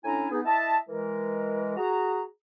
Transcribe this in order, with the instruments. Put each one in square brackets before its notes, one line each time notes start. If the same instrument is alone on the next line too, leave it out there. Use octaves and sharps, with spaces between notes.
[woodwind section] A2 C#4 D4 E4 G#5 A#5
B3 D#4 G#4
E4 D#5 E5 A5
E3 G#3 A#4
F#4 G#4 A#5